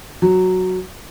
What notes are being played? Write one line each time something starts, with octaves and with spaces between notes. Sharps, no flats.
F#3